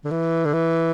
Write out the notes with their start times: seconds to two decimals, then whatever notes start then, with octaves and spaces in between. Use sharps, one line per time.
0.05 D3
0.11 E3
0.45 D3
0.53 E3